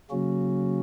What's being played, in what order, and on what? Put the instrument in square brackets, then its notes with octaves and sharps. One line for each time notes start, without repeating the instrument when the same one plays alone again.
[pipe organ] C#3 F#3 A#3 C#4 F#4